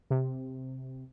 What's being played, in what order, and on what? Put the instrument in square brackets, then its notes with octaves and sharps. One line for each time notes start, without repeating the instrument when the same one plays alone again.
[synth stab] C3